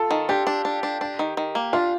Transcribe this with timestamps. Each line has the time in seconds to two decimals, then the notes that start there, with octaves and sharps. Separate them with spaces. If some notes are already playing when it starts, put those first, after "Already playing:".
Already playing: F4 A4
0.11 D#3
0.29 D4 G4
0.47 D4
0.65 D4
0.83 D4
1.01 D4
1.19 D#3
1.37 D#3
1.55 A#3
1.73 D4 F4